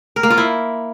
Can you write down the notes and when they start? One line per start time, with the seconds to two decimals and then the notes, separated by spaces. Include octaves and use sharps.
0.16 A#4
0.23 A#3
0.30 F4
0.37 E4